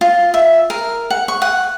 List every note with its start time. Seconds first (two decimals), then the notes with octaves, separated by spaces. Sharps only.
0.01 F4
0.34 E5
0.70 A#4
1.10 F#5
1.28 C#6
1.42 F#5